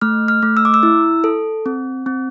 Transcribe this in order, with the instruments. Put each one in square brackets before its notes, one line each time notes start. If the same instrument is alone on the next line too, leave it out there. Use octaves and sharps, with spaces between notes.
[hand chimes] A3 F6
F6
A3
E6
D6
E6
E4
A4
C4
C4